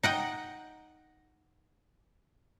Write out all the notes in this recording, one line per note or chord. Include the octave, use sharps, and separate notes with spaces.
D#4 F#5 G5